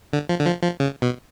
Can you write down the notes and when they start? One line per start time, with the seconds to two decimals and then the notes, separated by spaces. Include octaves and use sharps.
0.13 D3
0.29 F3
0.40 D3
0.46 F3
0.63 F3
0.80 C#3
1.02 B2